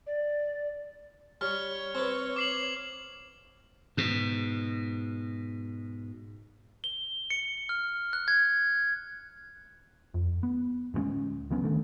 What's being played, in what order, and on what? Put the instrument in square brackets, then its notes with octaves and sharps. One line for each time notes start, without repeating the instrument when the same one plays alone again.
[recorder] D5
[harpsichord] G3 [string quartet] C#5 [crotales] F6
[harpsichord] C4 B4
[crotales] D6 C7 F#7
[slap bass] G#2 B2
[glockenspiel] G7
C#7
F6
F#6
G#6
[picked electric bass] F2
B3
D1 G2 G#3 C#4
C#2 F#3 B3 C#4
D3 D#3 A3